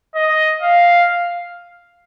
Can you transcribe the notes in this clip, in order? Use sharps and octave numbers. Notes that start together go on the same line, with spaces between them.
D#5
F5